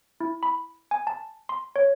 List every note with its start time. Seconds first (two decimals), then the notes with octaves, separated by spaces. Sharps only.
0.21 E4
0.43 B5
0.91 G#5
1.07 A5
1.49 C6
1.76 C#5